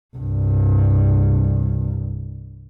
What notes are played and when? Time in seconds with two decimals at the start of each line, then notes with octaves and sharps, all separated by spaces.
0.16 C2 G2